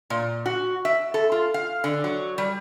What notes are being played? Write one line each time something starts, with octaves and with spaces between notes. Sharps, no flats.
A#2
F#4
E5
A4
F4
F5
D3
F#3
G3